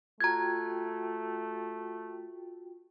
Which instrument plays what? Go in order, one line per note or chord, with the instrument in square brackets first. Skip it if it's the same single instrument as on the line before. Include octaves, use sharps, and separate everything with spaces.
[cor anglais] A3 [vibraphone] F4 F#4 G5 [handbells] A#5 G#6